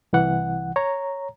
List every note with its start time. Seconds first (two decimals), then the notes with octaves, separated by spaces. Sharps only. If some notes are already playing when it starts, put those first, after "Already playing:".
0.13 C2 E3 F#5
0.76 C#5 A#5